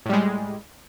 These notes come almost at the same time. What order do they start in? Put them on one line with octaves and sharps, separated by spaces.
A2 G3 G#3